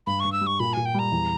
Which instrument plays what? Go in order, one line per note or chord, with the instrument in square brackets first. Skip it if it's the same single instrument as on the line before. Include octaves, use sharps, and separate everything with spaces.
[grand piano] G2 [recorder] B5
[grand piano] G2 [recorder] C#6
[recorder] E6
[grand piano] G3
[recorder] C#6
[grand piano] A#2 [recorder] B5
[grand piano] A#2 [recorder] G#5
[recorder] G5
[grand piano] G3 [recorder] A#5
[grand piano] E2